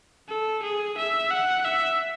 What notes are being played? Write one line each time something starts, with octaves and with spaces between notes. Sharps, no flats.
A4
G#4
E5
F#5
E5